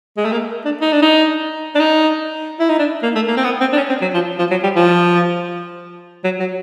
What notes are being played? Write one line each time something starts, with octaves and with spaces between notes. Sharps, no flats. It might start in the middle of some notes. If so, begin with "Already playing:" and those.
G#3
A3
A#3
D4
D#4
D4
D#4
D4
D#4
E4
D#4
D4
A#3
A3
A#3
C4
B3
C4
D4
C#4
C4
F#3
F3
F3
F#3
G3
F3
F#3
F#3